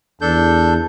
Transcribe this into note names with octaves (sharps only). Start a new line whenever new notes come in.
E2 D4 A4 G6